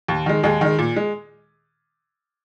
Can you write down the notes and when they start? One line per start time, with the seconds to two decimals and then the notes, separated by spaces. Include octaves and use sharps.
0.08 D#2
0.26 D#3 G#3
0.43 D#2 G#3 G#4
0.61 D#3 G#3
0.79 A#2
0.96 G#3